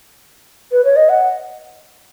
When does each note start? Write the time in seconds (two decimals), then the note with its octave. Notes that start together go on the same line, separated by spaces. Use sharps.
0.71 B4
0.84 C#5
0.96 D#5
1.09 F#5